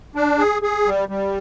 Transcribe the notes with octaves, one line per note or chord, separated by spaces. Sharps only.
D4
G#4
G#4
G3
G3